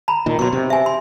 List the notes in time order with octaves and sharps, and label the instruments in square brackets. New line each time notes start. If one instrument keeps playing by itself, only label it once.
[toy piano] A#5 B5
[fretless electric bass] A#2 D#3
[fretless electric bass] B2 F3 F#3 [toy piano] C6 C#6
[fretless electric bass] C3
[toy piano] E5 G#5
C6